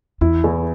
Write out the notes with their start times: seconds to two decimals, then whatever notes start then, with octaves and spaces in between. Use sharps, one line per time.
0.21 E2 E4
0.44 E2